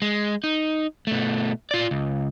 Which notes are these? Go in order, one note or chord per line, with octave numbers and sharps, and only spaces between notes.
G#3
D#4
B2 A3
F4 D5
C#2